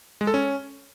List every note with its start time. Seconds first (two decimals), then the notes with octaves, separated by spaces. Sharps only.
0.21 G#3
0.27 A4
0.34 C#4